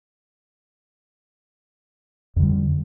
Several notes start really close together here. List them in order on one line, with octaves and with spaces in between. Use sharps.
F2 D3 G3